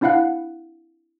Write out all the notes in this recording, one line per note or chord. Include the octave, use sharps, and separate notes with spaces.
C4 D4 E4 F5 F#5 F#6